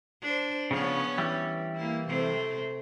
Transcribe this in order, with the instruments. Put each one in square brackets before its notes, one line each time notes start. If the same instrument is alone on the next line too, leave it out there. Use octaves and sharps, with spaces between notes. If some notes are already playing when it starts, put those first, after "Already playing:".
[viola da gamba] D4 C5
[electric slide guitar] C#3 F3 [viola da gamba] B3 C#4 C#5
[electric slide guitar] E3 G3
[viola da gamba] A#3 E4
C3 A3 C4